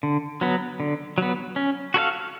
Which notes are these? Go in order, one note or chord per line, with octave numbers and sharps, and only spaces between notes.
D3
F#3 B3
D3
F#3 B3
C#4
F#4 A4 C#5 F5